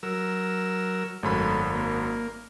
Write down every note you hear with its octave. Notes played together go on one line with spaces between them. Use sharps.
F#3 A#4 E6
G#1 F#2 A3 B5
A#3